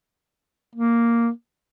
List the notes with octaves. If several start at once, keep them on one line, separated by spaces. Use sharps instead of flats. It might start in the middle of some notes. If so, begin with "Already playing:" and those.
A#3